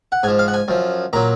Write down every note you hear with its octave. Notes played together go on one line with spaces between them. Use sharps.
F#5
G#2 F3 G#5
F5
F#5
G#5
F#2 F3
A#2 F#3 A#5